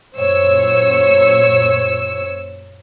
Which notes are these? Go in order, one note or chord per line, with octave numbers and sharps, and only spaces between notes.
F#2 A#2 C5 C#5 E6 C#7